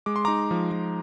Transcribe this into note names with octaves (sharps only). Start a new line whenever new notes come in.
G#3 D6
C6
D#4 A#5 D6
F3
F3